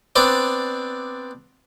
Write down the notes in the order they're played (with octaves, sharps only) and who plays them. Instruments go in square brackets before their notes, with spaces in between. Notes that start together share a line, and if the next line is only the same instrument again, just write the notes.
[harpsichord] B3 C4 D4 D5